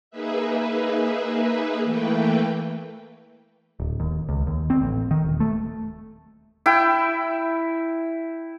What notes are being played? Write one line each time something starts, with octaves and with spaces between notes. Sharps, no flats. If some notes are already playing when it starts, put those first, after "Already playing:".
A#3 D#4 G#4 B4 E5
E3 A3 A#3 B4 G5
D1
D#2
C#2
D#2
C4
A1
D#3
D#1
A3
E4 G5